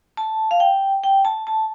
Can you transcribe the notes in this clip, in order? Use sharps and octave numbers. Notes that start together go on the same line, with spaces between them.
A5
F5
G5
G5
A5
A5